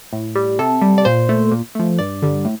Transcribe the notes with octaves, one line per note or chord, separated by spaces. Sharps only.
A2
G3
C3 A4
G3
D5
A#2 C5
A3
A#2
F3 A3
G2 D5
D3 G3
A2